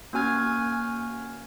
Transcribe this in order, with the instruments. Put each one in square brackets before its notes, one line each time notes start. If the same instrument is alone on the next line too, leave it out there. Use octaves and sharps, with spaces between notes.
[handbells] A#3 C#4 F#4 G#5 F6 G#6